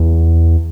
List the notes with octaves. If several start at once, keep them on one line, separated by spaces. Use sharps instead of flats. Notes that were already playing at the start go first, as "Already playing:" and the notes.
Already playing: E2